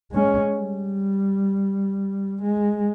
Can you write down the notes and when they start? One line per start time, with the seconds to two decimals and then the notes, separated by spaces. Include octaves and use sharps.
0.11 G#3 C#4
0.56 G3
2.42 G#3